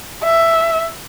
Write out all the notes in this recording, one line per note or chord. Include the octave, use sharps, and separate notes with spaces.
E5